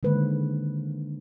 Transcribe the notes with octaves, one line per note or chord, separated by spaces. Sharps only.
D3 D#3 G#3 A#3 B4 C5